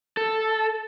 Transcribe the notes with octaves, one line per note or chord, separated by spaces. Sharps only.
A4